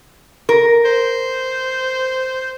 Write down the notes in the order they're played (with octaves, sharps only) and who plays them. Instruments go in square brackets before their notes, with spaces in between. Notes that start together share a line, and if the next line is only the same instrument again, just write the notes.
[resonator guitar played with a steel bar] A#4
[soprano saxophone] C5